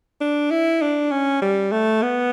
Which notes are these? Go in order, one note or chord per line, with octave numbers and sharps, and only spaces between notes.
D4
E4
D4
C#4
G3
A3
B3